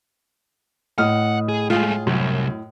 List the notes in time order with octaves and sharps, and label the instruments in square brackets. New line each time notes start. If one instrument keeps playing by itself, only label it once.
[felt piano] A2 D#5 D#6 [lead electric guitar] F#5 [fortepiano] F6
[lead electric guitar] G#4
[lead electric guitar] G#3 A3 [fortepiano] F4 G#4
[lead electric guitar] C2 [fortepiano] F#2